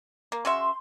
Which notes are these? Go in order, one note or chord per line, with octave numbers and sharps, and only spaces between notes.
A#3
C#3 F#4 E5 C6